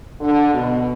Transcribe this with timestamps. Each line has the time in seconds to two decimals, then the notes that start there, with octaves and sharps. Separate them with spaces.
0.21 D3
0.54 B2